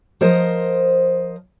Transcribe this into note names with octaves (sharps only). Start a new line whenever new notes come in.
F3 A#4 C5 D#5